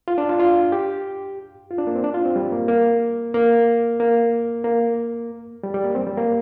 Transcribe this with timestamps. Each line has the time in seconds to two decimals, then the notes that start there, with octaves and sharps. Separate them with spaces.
0.08 F4
0.18 D4
0.29 F4
0.39 F4
0.72 G4
1.71 F4
1.78 D4
1.87 A#3
1.95 C4
2.04 D4
2.14 F4
2.26 C4
2.36 G3
2.52 A#3
2.68 A#3
3.34 A#3
4.00 A#3
4.64 A#3
5.63 G3
5.74 G3
5.84 A#3
5.95 C4
6.07 G3
6.17 A#3